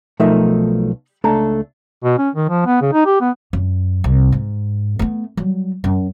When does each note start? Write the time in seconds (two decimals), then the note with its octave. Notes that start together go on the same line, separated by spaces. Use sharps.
0.20 B1 F3 A3 D#4 A#4 E5
1.24 C#2 A3 D4 A4 A#5
2.04 B2
2.18 C#4
2.35 D#3
2.49 F3
2.66 B3
2.81 C#3
2.93 D#4
3.06 G4
3.21 B3
3.53 F#2
4.04 C2
4.32 G#2
4.99 A3 B3
5.37 F#3 G3
5.84 F#2